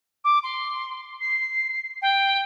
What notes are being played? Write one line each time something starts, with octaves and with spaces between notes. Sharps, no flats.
D6
C6
C7
G5